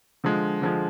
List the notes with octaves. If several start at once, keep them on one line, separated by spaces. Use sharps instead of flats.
D3 F3 G#3
D3 F3 G#3